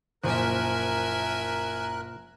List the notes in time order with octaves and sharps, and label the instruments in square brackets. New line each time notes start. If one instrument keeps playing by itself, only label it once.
[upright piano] F#1 [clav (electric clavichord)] A#2 F3 [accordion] A#4 F#6 [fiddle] E5 G#5